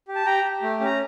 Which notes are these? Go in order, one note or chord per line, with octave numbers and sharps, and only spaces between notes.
G4
A5
G4 G5 A#5
G4
A3
C#4 A#5